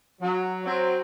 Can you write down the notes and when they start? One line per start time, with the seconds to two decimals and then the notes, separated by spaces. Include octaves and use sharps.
0.21 F#3
0.66 F#3 C4